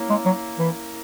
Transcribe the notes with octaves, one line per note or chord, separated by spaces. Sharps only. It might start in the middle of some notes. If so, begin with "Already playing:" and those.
Already playing: A#3 C#4 E4
G#3
F#3
E3